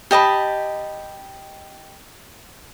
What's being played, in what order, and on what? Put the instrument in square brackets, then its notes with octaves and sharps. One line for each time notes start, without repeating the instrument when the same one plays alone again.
[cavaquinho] G4 D#5 A5 B5